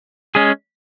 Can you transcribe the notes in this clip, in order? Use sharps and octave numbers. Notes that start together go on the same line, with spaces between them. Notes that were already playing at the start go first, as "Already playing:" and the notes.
G#3 C#4 G#4